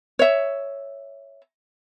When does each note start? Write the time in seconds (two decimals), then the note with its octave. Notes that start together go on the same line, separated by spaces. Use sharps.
0.19 C#5 E5